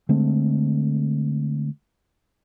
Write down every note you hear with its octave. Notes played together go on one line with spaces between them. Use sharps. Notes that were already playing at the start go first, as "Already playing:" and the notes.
D3 G#3 A3 C4